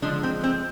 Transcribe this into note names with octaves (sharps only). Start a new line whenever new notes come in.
D3 F3 G#3 D4
C4
C4